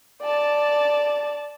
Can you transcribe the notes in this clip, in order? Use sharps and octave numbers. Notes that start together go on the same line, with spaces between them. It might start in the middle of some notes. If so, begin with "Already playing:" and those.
D5 A5